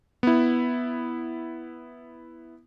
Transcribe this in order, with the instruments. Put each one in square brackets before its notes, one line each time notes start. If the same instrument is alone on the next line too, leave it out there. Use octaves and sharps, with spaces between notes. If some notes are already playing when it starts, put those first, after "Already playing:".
[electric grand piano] B3 E4